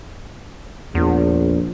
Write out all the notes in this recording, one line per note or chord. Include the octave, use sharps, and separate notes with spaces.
A#1 E2